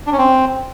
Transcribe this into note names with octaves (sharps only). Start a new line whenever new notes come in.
D4
C#4
C4